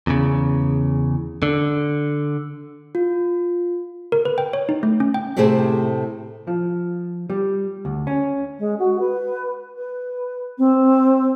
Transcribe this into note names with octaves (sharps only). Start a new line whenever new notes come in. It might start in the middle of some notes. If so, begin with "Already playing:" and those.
E2 C#3
D3
F4
A#4
B4
G5
C#5
D#4
A3
C#4
G5
A2 C3 A3 G4 G#4 C5
F3
G3
D2
C#4
G#3
F#4
B4
B4
C4